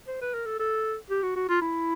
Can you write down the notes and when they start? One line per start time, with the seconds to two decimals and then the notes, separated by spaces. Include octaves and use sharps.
0.08 C5
0.22 B4
0.34 A#4
0.46 A4
0.59 A4
1.10 G4
1.23 F#4
1.36 F#4
1.49 F4
1.62 E4